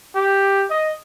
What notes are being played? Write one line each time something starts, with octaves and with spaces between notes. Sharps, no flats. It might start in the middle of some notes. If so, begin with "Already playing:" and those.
G4
D#5